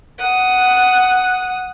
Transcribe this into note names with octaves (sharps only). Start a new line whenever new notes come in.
F#5 D#6